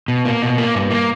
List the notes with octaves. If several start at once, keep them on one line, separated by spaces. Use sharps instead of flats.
B2
A#3
B2
A#3
G2
A#3